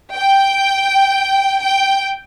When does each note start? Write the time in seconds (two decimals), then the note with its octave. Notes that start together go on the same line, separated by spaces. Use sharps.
0.15 G5
1.62 G5